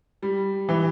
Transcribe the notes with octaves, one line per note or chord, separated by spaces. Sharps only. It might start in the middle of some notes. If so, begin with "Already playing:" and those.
G3
E3